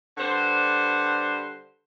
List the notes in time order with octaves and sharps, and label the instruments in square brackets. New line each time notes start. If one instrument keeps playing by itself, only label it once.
[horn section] D3 G3 B4 C5